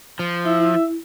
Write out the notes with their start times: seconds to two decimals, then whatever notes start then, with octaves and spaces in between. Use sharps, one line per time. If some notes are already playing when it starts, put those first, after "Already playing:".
0.19 F3
0.45 E4 E5